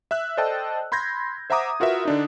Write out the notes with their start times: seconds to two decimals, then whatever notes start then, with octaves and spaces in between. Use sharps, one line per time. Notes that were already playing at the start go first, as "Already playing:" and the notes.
0.11 E5 E6 F#6
0.37 A4 C5 D5 D#5 G5 A5
0.92 B5 C6 G6 G#6 A#6
1.50 C5 E5 F#5 A#5 D6 D#6
1.80 F4 F#4 A#4 B4 E5
2.05 D3 D4 D#4